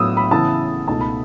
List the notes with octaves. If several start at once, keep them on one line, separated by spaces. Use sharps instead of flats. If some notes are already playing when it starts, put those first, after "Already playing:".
Already playing: A2 F#3 B3 D#6 E6
B5
C#3 E3 B3 E4 A5
C#2 B2 A3 D#4 A5
B5